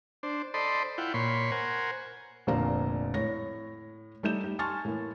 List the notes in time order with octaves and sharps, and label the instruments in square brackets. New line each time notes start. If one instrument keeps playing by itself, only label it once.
[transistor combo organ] D4 C5
A4 C5 D5 D#5 B5 C6
E4 F4 F#5 G5
A#2 C#5 B5 C6
A#4 C5 F#5 G#5
[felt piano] F1 A#2 D3 C5 F5 A#5
A2 C#5 A#6
G3 A3 D#4 G6 E7
G4
G#5 A5 C6 C#6 F6 A6
A2 E3 A#3